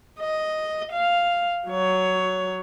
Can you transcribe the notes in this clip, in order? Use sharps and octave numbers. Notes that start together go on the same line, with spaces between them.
D#5
F5
F#3 C#5